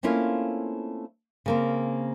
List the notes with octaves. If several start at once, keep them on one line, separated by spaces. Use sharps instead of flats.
A3 A#3 C4 C#4 E4 F4
C#3 A#3 C4